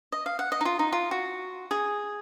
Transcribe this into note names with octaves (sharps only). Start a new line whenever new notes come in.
D#5
F5
F#5
D#5
D#4
F4
D#4
F4
F#4
G#4